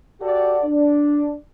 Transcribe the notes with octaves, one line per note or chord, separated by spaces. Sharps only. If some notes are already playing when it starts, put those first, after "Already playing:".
F#4 G4 A4 D5 F#5
D4